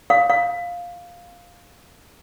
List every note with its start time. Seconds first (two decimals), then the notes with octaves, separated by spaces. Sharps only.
0.10 F5
0.30 F5